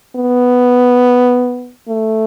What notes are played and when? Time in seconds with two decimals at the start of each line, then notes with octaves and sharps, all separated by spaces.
0.16 B3
1.88 A3